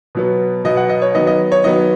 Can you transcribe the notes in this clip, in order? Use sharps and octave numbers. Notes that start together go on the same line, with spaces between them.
B2 F#3 B3
B2 F#3 B3 D#5
F#5
D#5
C#5
D#3 F#3 B3 D#5
D#5
C#5
D#3 F#3 B3 D#5